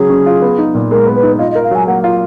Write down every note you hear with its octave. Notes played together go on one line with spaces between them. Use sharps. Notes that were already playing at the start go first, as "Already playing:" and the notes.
Already playing: C#3 F#3 G#4
C#4
F4
B3
D#4
A#2
G#3 A#4
B3
B4
D#4
F4 D#5
D#5
A#4
F5
F#3 G#5
A#3 F#5
F4 F5